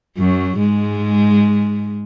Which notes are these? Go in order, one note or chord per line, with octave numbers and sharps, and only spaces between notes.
F#2 F#3
G#2 G#3